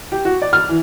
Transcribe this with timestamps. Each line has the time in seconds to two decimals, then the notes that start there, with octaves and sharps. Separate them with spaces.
0.12 G4
0.25 F#4
0.42 D5
0.53 F6
0.69 E3